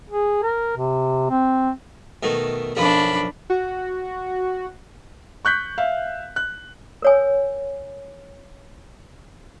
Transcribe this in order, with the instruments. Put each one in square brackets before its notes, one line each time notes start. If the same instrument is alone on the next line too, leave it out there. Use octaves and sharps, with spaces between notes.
[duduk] G#4
A#4
C3
C4
[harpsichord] B2 D#3 A3
[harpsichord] B1 F#2 F3 [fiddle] D4 B5
[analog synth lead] F#4
[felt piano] C#6 F#6 G6 B6
E5 F5
F#6
[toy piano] A#4 C#5 G#5